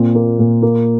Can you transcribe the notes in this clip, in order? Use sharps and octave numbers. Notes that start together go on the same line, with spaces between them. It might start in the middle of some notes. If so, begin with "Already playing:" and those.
Already playing: A#2 C4
A#3
A#2
A#3